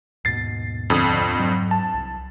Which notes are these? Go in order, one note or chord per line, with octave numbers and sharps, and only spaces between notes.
D#2 G#2 B2 A6 C7
F2 D3 D#6
G#2 F#3
A5
C2